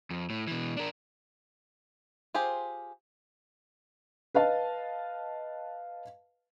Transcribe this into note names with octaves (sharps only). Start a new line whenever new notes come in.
F2
A2
B2 E3
D4 A#4
F4 G4 G#4 C5
B4 D#5 F5 A5